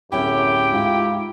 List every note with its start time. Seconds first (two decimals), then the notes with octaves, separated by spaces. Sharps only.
0.12 D1 F#2 C#4 E4 G4 G#4 G5
0.72 G#2 F4